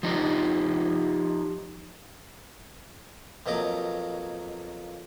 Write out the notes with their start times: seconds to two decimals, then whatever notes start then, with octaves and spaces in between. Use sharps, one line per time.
0.03 F3 D#4 G4
3.46 F2 B2 F#3 A#3 D#5 D6